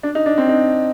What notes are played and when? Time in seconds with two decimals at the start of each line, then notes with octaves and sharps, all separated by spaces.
0.03 D4
0.15 D#4
0.26 D4
0.38 C4
0.49 D#4